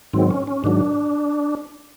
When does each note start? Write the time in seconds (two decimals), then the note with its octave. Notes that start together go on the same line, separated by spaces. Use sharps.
0.13 G#2 D#3 F#3 C4
0.31 C#4
0.47 C#4
0.64 G#2 D#3 F#3 D4